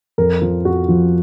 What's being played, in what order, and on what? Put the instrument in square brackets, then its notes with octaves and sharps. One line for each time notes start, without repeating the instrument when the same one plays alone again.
[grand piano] F2 A#4
F3
F2 F#4
F3